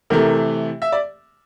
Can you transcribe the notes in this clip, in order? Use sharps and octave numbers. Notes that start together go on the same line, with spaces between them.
C3 E3 A3 A#4
E5
D5